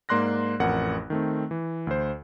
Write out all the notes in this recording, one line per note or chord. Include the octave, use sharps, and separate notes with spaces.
G#2 A#3 D5 C6 F#6 A#6
A1 F2 A#4 F#5
D#3 A3 C4
E3
D2 C5